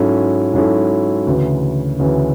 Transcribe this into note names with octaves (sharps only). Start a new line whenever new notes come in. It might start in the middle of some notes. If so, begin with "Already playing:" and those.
Already playing: G#2 F#3 C#4 E4 A4
G#2 F#3 C#4 E4 A4
D2 C#3 E3
D2 C#3 E3